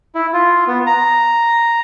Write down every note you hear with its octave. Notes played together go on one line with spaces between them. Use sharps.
E4
F4
B3
A#5